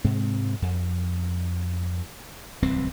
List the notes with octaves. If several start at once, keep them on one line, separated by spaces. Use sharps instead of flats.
G#2 C3 G#3 C4
F2
D1 C2 E3 C4